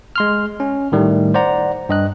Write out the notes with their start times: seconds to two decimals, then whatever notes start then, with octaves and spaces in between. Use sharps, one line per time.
0.16 G#3 C6 F6
0.60 C#4
0.92 A2 D#3 G3 A3
1.34 C5 D5 F#5 A#5
1.89 G2 D#5 F#6